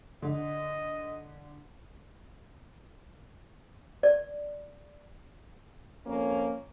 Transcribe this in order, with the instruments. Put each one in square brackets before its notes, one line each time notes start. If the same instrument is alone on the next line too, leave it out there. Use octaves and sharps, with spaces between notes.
[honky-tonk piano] D3 [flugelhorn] D#5
[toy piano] D5
[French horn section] F2 A#3 C#4 C#5